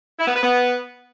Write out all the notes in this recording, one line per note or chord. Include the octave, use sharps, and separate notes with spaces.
E4
B3
B4
B3